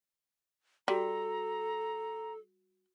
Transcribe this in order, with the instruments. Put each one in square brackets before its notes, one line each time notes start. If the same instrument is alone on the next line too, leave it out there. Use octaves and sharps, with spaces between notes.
[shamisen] G3 [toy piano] F#4 [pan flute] A4 [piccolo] A#5